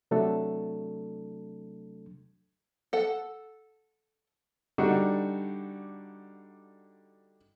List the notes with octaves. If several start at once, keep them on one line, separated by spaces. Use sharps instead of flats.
C3 F#3 A3 D4 A4
A4 F#5
D3 G3 D4 D#4 F#4